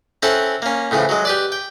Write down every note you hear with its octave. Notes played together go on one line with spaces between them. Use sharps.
C4 C#4 E4 A4 F#5
A#3 C#4
A2 C#3 E3 F3
F#3 G#3
G4 B4 D5
G5